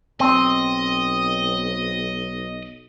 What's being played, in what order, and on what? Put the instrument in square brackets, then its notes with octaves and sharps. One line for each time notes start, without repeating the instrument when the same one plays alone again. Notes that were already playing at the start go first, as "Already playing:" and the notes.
[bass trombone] B1 [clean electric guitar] C4 [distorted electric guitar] D#5